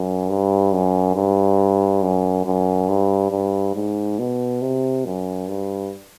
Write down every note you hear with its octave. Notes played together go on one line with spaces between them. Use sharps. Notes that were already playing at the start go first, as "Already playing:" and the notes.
Already playing: F#2
G2
F#2
G2
F#2
F#2
G2
G2
G#2
B2
C3
F#2
G2